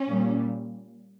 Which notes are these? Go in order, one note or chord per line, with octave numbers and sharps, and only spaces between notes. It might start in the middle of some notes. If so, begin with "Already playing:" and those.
Already playing: C#4
A#2 G3